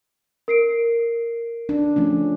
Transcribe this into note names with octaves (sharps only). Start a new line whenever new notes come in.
A#4 C7 D7
D4
F3 A3 C#4